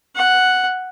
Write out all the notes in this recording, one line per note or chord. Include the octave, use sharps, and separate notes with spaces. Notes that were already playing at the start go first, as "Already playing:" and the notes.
F#5